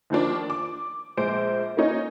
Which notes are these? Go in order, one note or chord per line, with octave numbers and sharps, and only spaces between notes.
D#2 D#3 F3 D4
D6
A#1 G#3 C5 D7
A#3 C#4 D#4 C#5 D#5